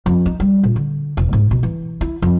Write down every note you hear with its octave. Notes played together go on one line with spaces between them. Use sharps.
F2
D#4
G3
A#2
D3
E1
G#2
B2
E3
E4
F2